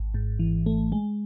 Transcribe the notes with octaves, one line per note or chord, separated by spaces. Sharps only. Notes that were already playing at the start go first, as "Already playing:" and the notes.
Already playing: G#1
G#2
E3
A3
G#3